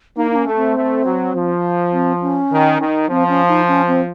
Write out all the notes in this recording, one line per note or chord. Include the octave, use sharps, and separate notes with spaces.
A#3 D#4
D#4
C#4
A3
C4
A3
F#3
F3
C4
C#4
D#3
D#3
F3 C4
C#4
D#4
C#4
C4